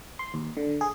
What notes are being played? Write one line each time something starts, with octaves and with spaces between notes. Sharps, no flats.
C6
D#2
D3
G#4